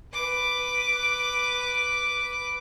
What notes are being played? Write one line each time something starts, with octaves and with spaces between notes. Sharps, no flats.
B4 D6